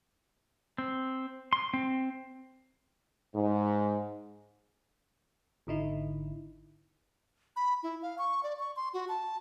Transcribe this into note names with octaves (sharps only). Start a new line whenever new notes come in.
C4
C6
C4
G#2
G#1 D3 D#4 E4
B5
E4
F5
C#6
D5
C#6
C6
F#4
A5